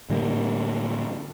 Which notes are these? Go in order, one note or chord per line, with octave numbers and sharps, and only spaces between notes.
A2 D3 G3 A#3